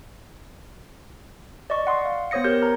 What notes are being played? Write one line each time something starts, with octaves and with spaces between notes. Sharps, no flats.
D5 D#5 C#6
F#5 C6 D#6
F5
B3 C5 C#5 D#6 A#6 C#7
G4 A#4 G6
A#4 A#5